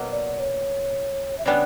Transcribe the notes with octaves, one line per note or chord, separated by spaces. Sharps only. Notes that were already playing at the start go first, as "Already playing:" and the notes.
Already playing: B2 F#3 A#3
D5
C#5
E5
C#3 G3 B3 D4 D5